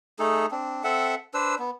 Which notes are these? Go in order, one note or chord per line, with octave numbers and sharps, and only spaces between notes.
A3 D#4 G#4 A4
C4 D4
C4 A4 E5 F#5
D4 B4 C5 E6
B3